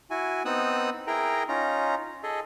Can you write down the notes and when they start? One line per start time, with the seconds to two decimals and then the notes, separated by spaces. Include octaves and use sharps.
0.10 E4 F#4 G#5
0.45 B3 C4 D#4 D#6 E6 F#6
1.07 E4 G#4 A#4 G5 A#5
1.48 C#4 D#4 F4 A#5
2.23 G#4 A4 D#5